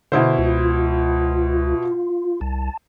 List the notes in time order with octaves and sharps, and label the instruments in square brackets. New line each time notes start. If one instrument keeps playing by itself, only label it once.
[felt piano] B2 E4 C5 [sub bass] D3
[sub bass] C#2 [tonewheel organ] F4
[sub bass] C2 [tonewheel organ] A5